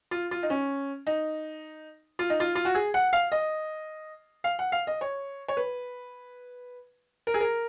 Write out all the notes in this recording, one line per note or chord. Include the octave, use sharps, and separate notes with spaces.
F4
F4
D#4
C#4
D#4
F4
D#4
F4
F4
F#4
G#4
F#5
F5
D#5
F5
F#5
F5
D#5
C#5
C#5
B4
A#4
G#4
A#4